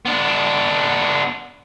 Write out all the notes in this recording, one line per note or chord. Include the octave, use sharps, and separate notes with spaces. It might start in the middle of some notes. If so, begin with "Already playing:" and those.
B3 D4